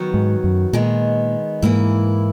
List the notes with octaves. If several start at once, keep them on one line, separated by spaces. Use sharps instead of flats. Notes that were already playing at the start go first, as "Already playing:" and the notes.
Already playing: D#3 F#3 B3 F#4
G#2
F#2
A#2 D#3 G#3 B3
G#2 E3 A#3 E4